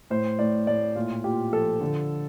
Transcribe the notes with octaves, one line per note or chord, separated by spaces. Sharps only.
A2 C5
A2 D5
A2 D5
A#2 F4
A#2 G4
F3 A4
D3